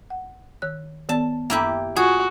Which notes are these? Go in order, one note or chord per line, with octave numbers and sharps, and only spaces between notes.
F#5
D#3 C#5 F#6
D#3 B3 D5 A5
F#2 A#3 E4 G4 B5
F4 F#4 G#4